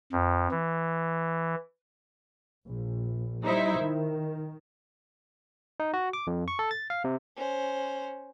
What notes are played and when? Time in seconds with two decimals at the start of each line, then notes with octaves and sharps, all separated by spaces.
0.13 F2
0.51 E3
2.65 A#1
3.43 G3 D#4 E4 C5 E5
3.78 D#3
5.80 D#4
5.94 F#4
6.13 D6
6.27 F2
6.48 C#6
6.59 A4
6.71 A6
6.90 F5
7.04 C3
7.36 C#4 C5